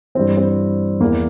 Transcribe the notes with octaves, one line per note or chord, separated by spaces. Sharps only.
G2 E3 C4
C4
E2 E3 A#3